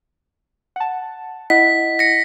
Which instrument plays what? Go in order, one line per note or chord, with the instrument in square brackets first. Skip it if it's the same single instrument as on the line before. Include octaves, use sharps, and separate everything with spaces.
[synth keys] F#5 A5
[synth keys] E4 D#5 F#5 [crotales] B6
[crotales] A#6 C#7